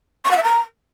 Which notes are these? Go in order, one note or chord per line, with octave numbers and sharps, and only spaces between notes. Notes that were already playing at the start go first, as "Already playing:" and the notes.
C#6
F#5
E5
A#5